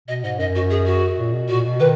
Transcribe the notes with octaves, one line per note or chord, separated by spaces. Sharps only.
B2 D#5
G#2 D#5
F#2 D#5
F#4
G#4
F#4
A#2
B2
A#2 F#4
B2
D#3 B4